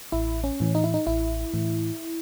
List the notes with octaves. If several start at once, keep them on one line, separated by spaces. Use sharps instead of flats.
A1 E4
C#4
A2 E3
D#4
E4
D#4
A1 E4
A2 E3